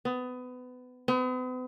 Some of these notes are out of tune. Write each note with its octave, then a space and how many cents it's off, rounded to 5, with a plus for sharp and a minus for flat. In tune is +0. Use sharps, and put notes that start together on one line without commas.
B3 +25
B3 +45